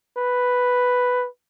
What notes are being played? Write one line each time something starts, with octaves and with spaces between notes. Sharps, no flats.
B4